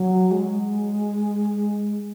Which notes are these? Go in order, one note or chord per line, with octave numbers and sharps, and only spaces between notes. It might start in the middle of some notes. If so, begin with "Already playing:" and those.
Already playing: F#3
G#3